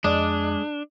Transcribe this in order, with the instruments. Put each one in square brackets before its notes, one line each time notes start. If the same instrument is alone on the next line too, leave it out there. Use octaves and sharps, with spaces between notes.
[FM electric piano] F2 D5 D#5 [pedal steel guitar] G#3 [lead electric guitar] D4